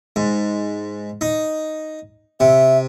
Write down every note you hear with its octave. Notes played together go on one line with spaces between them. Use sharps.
G#2
D#4
C3 E5